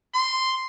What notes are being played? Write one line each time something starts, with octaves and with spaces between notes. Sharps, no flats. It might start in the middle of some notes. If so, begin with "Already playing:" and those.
C6